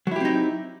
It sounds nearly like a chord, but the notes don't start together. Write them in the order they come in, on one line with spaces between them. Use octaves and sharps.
F#3 E4 G4 C4 D#4